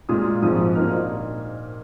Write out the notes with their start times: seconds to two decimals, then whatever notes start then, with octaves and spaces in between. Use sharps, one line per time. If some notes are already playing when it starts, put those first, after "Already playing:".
0.09 A#2 G#3 F4 D#6
0.42 G#1 G#2 F3 D#6
0.75 A#2 A#3 D#4 F6